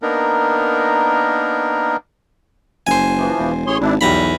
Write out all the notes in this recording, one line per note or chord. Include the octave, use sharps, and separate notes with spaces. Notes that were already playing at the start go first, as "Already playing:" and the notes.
A#3 B3 D4 D#4 A#4
F#1 C5 G#5
E3 F3
E1
A1 G#4 C#5 C6
G#1 D4 E4
B1 E2 G3 A#5 B5